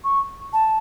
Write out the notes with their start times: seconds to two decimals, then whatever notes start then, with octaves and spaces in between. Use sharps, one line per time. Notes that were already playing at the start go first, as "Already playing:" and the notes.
0.04 C#6
0.53 A5